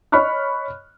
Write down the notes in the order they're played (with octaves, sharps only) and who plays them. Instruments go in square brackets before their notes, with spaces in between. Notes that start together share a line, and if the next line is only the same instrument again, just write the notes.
[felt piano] C#5 D#5 B5 C#6 F6 F#6